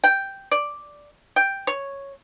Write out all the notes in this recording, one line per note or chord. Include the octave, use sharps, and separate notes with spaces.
G5
D5
G5
C#5